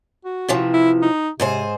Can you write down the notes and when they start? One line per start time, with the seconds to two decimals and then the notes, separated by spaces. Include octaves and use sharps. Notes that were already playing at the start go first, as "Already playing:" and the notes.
0.25 F#4
0.49 C3 E3 F3
0.73 E4
1.02 D#4
1.40 G#2 C3 G#4 C5